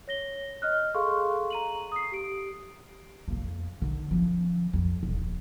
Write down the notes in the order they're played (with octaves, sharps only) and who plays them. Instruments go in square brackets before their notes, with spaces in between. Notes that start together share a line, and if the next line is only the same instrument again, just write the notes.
[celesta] C#5 A#6 G7
D#5 F6 F#6
G#4 A4 F5 C6 C#6
A#5 D#7 F#7
D#6 C7
G4 D7
[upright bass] F2 A#3
D3 D#3
F3 C#4
F2
D#1 G#1